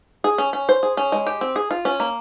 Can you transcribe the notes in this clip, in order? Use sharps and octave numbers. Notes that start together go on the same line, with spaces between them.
G#4
C#4
C#4
C5
G#4
C#4
G#3
G4
C4
G#4
F4
C#4
A#3